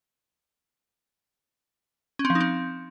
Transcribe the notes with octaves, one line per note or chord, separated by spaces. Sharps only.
C#4
C4
F3
D#4
C4